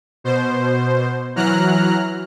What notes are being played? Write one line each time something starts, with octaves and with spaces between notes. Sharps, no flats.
B2 C5
E3 F#3 A#5 F6 F#6